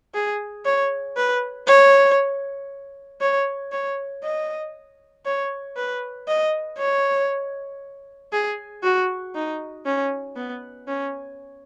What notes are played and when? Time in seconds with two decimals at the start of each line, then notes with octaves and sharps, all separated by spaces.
0.14 G#4
0.65 C#5
1.16 B4
1.67 C#5
3.21 C#5
3.72 C#5
4.23 D#5
5.25 C#5
5.76 B4
6.27 D#5
6.78 C#5
8.32 G#4
8.83 F#4
9.34 D#4
9.86 C#4
10.36 B3
10.88 C#4